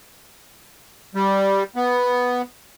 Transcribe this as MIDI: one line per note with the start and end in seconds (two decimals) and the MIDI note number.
1.15 1.64 55
1.76 2.42 59